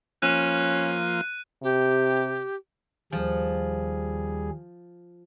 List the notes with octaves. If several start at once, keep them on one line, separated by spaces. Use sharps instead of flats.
F3 A#3 C#4 F4 F#6 D#7
C3 G4
D#2 F3 G3 G#4